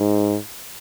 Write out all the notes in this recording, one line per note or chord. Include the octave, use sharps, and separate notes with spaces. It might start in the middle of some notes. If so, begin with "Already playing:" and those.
Already playing: G#2